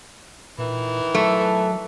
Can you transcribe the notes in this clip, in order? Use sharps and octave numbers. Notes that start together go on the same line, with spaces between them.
A#2 D#3 E3
F#3 A3